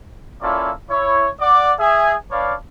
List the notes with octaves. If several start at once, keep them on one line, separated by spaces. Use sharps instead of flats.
A#3 C#4 E4 F4 A4 D5
E4 C#5
D5 F#5 D6
G#4 E5 G#5
D4 B4 C#5 D5 F5